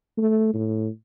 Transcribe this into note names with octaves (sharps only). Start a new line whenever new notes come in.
A3
A2